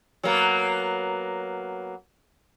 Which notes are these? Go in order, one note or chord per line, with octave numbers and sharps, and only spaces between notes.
F#3 A#3 B3